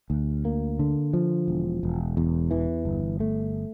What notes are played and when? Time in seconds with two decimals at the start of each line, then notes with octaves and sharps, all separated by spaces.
0.10 D2
0.45 A#3
0.79 D3
1.13 F3
1.48 E1
1.83 E1
2.17 E2
2.51 E3
2.85 G1
3.20 A3